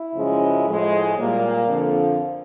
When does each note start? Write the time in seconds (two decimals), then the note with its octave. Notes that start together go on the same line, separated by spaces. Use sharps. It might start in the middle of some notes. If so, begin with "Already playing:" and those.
Already playing: E4
0.15 F#2 C#3 F3 G#3
0.66 A2 F3 G#3
1.17 A#2 G3 A#3
1.67 F2 D3 F3